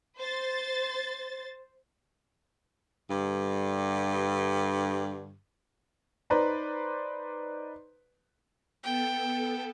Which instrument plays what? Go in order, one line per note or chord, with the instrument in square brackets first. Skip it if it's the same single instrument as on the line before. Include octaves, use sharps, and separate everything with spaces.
[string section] C5 A6
[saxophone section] G2 D3
[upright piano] D#4 B4 C5 D5 A#5 C6
[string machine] B3 A4 [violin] G5